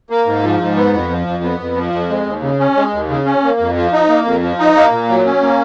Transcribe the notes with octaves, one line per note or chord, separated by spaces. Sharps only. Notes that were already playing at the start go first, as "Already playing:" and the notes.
A#3
G#2
F3
G#2
B3
F2
F3
F2
B3
F2
F3
F2
G#3
D#2
C#3
C#4
G#3
D#2
C#3
C#4
A#3
F2
F3
D#4
A#3
F2
F3
D#4
A#3
A#2
F#3
C#4
A#3